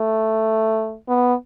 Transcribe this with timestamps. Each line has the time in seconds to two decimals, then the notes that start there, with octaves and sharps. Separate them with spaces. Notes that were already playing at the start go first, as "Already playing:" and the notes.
Already playing: A3
1.09 B3